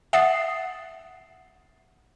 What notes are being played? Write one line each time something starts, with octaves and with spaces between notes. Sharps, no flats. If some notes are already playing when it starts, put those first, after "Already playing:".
E5 F#5 D#6 A6 C7